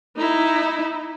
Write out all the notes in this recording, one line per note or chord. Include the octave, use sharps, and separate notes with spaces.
D#4 E4